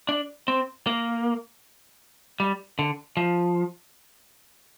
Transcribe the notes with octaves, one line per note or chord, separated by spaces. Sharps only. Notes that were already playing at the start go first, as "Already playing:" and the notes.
D4
C4
A#3
G3
D3
F3